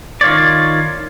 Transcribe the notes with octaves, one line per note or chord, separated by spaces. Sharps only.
D#3 F4 C#5 D5